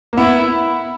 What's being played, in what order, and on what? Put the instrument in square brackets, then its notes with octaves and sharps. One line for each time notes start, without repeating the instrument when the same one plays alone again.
[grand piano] A#3
[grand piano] B3 [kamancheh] E4